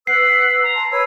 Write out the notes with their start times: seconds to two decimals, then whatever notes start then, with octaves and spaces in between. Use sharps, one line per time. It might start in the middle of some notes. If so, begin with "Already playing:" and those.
0.07 B4 F#5 E6 C7
0.63 A#5
0.74 A5 C6
0.91 B4 C#5 E6